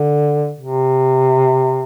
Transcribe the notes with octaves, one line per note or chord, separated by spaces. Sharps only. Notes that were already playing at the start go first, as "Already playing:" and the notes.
Already playing: D3
C3